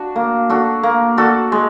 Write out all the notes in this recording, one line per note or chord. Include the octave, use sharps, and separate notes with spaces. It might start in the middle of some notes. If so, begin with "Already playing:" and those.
Already playing: D4 F#4
A#3
D4 F#4 A4
A#3
D4 F#4 A4
G#3